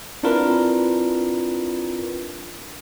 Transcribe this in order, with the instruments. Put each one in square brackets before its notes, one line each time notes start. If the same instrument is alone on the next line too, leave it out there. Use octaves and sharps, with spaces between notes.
[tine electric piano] C4 D4 E4 F4 A#4 B4